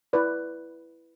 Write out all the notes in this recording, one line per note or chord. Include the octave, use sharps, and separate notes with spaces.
E4 B4 D5